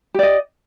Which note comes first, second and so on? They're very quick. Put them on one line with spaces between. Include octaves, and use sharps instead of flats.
G4 D5 D#5